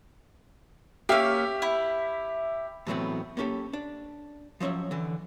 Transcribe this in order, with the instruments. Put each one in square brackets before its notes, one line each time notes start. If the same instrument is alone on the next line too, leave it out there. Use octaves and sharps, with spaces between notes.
[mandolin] A#3 C#4 [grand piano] G4 E5
[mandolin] E4
[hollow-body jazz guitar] A2 E3 F#3 A3 B3 C4
A#3 B3 C#4 G4 A4
D4
F3 F#3 C4 C#4 E5
D3 E3